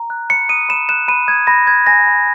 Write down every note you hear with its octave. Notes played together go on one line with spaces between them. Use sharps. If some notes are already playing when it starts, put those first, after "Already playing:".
Already playing: A#5
F#6
B5 C#7
D#6 D#7
B5 E7
F#6 E7
B5 D#7
D#6 G#6
B5 A#6
F#6 G#6
G#5 A#6
B5